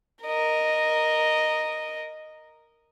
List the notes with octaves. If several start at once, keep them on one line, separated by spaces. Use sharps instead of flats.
A#4 D#5